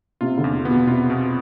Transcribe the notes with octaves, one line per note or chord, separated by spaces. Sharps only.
C3 F4
D3
E2
B3
B2
C3 F4
B2